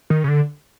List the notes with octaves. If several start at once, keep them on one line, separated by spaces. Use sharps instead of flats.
D#3
C#3
D3